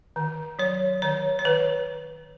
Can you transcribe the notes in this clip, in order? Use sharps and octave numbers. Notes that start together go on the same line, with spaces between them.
D#3
F#3 C#5
D#3 C#5
C#5
D#3 B4